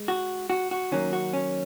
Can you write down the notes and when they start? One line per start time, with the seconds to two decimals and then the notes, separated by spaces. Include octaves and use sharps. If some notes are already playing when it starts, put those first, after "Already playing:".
Already playing: G#3
0.08 F#4
0.50 F#4
0.71 F#4
0.92 D#3 F#3 A#3 C#4
1.13 F#4
1.33 C#4